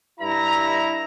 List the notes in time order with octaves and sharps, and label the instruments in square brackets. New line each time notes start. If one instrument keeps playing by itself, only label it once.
[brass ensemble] G2 E4 A#5